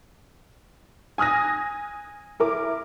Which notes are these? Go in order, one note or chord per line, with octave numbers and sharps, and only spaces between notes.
G#5 D#6 F6 F#6 A#6
E4 A#4 D6